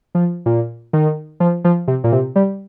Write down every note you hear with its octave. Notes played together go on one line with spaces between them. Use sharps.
F3
A#2
D#3
F3
F3
C3
A#2
C3
G3